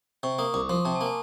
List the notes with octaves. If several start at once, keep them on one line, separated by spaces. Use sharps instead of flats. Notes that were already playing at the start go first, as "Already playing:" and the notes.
C3 C#6
A#3 D#6
C2 D6
F3 C6
C3 A5
G#5
A#3
G#5